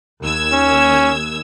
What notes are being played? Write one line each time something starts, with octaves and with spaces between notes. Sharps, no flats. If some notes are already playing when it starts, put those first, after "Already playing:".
D#2 E6 G#6
C#4